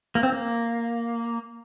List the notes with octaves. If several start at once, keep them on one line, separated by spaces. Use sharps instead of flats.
A#3
C4
A#3